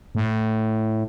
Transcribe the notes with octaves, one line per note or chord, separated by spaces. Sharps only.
A2